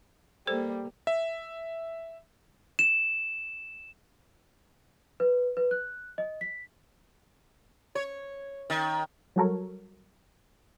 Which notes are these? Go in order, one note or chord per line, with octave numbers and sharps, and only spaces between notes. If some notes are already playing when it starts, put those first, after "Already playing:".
G3 A#3 A4 C5
E5
E7
B4
B4
F#6
D#5
B6
C#5
D#3
F#3 G3 F#4 A4 A#4 C#5